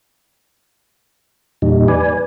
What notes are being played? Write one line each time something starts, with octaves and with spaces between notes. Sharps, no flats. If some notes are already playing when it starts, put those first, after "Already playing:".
E2 A#2 G3 D#4
B4 D5 G#5